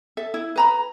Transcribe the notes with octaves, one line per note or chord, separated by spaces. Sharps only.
A4 E5
E4
B4 A#5 B5